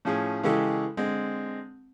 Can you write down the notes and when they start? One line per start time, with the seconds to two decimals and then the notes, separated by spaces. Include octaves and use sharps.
0.05 A2 F3 C#4 G#4
0.43 C#3 E3 G#3 G4 A4
0.97 D3 G#3 C4